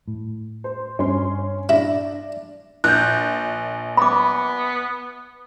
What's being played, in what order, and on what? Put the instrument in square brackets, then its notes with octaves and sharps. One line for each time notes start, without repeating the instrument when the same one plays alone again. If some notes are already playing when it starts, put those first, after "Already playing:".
[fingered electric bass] A2
[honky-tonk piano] C5
[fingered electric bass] G2 [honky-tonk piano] C#4 C6
[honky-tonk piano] D4 A#6 [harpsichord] E4
[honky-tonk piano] A#1 [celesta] F#6 G6
[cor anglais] B3 [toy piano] B5 D6